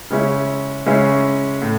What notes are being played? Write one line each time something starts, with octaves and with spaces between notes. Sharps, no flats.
C#3 G#3 C#4 E4
C#3 G#3 C#4 E4
A2